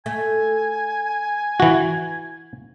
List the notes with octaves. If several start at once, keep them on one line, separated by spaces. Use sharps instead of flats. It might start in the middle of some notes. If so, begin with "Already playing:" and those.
A3 G#5
E3 F#4